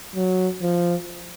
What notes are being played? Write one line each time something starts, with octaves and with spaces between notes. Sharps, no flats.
F#3
F3